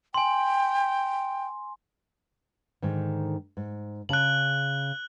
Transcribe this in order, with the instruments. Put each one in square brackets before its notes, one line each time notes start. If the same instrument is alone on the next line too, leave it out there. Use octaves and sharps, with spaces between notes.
[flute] G5 [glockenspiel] G#5 C6
[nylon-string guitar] G#2 D3 D#3
G#2
[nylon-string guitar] C#3 A5 [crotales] F#6 F#7